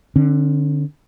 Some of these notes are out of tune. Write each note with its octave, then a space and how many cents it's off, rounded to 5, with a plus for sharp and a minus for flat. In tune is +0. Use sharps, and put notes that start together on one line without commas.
D3 +15 C#4 -40